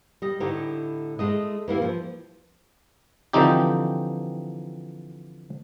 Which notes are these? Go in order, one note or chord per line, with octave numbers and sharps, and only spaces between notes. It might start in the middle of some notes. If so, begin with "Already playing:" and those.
G3 D#5
A2 D3 D#4 E4 G4
G#3 A3 D#5
E3 G3 A#3 E4
F3
D3 E3 F3 C4 D#4 G4